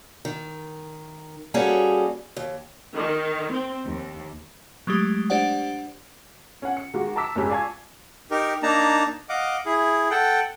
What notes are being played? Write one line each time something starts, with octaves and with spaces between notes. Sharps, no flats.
D#3
G3 A#3 C#4 F#4 G#4 A4
D#2
D#3
C4
D#2
F#3 G#3 A3 G4
D4 G4 C5 D5 F#5
C#4 F#5
C#7
D#3 G#3 F#4 G4
A5 A#5 D6 E6 B6
F#1 G#2 G#3 C#4 G4 G#5
D5 F5 G#5 A5 C#6 G#6
D#4 G4 A#4
A#3 D4 D#4 A5 A#5
D#5 F5 F#5 D6
E4 G#4
A4 F#5 G5